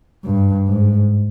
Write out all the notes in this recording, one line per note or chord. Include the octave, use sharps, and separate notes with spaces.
G2
G#2